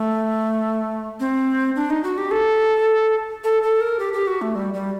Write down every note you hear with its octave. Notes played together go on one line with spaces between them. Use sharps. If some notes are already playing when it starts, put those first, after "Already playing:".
Already playing: A3
C4
D4
D#4
F#4
G4
A4
A4
A4
A#4
G4
G4
F#4
A3
G3
G3